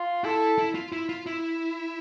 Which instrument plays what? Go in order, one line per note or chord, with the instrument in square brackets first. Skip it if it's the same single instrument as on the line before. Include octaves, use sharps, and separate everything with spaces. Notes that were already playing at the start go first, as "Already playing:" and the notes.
Already playing: [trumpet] F4
[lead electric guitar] E4 [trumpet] A4
[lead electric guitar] E4
F4
E4
F4
E4